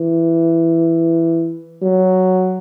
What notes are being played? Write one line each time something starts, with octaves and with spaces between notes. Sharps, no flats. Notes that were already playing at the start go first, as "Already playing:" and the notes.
Already playing: E3
F#3